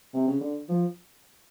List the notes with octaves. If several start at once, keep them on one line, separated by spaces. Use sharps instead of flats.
C3
C#3
D3
F3